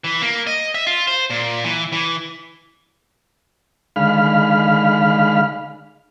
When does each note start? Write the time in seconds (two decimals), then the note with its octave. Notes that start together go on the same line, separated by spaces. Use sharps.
0.04 E3
0.22 A#3
0.47 D#5
0.75 E5
0.87 F4
1.08 C5
1.30 A#2
1.64 E3
1.92 E3
3.96 D3 D#3 G#3 F5 B5 F6